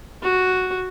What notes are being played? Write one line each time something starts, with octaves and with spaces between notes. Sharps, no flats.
F#4